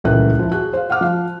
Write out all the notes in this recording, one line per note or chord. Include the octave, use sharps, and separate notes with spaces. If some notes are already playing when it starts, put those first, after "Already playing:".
D#1 C#2 E3 A#4 F#6
F3 E4
F#4 G#4 F#6
C5 F5
F5 F#5 D6 F6
F3 F5